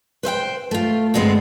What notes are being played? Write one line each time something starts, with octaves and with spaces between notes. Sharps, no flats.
B4 C5 E5 G5
A3 F4
D2 G2 G#3 B3 C4 C5